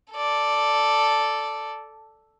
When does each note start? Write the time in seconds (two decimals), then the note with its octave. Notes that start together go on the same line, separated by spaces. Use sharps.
0.12 A4 D5